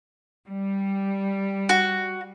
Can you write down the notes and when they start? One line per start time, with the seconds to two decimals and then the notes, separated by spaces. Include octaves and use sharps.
0.48 G3
1.69 F#4